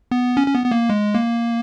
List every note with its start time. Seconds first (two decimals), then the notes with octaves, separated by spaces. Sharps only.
0.11 B3
0.37 C#4
0.47 C#4
0.55 B3
0.66 B3
0.71 A#3
0.90 G#3
1.15 A#3